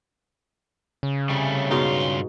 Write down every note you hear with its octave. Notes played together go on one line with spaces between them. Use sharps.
C#3
C3 G3 A3
G2 B2 G#3 D#4 F4